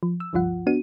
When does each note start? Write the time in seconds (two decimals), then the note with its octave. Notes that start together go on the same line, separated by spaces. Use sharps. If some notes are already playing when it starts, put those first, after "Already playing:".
0.03 F3
0.20 E6
0.33 G#1 C#2 G2 F3 F4 F#5
0.67 B3 D4 F#4 D#7